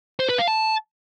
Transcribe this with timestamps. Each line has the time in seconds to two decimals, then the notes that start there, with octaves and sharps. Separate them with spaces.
0.20 C5
0.29 B4
0.38 F5
0.48 A5